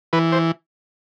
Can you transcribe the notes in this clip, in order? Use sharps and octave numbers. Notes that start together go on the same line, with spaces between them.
E3 B4
C5